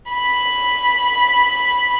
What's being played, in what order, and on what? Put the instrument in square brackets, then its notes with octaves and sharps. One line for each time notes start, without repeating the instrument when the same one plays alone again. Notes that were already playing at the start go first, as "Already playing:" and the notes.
[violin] B5